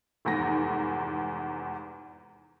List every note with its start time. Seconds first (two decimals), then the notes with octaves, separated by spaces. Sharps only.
0.25 F1 E2 G#2 A#6